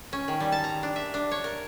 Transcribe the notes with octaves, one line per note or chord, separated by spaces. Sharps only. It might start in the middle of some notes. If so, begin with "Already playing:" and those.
C#4
D#3
G3
A5
A#5
D4
E5
D4
C#5
A#4